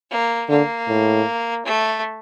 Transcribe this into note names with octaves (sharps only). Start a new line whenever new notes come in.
A#3
D3 A#3
A2
A3